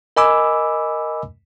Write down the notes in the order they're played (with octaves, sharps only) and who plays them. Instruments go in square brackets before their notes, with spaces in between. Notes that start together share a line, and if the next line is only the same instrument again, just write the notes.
[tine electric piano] A#4 D#5 G#5 B5 D6 E6